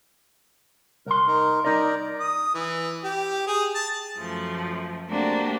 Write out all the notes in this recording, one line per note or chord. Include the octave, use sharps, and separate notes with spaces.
C2 A#4 C6
D#4 A#4
D#4 A#4 D5 D#5 A#5
D#6
E3
G4
G#4
A5
F#2 F3 A3
A3 A#3 C4 D4 F#4 G4